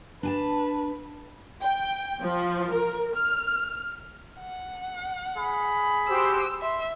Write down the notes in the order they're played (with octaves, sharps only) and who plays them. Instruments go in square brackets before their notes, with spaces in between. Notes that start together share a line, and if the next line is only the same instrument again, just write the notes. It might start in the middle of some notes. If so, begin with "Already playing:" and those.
[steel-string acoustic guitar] D4 G#5 A5 [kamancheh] B4
[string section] G5
F3
A#4
F6
[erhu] F#5
[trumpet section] G#4 B5
[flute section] F#4 G4 C5 [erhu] E6
[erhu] E5 [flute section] C6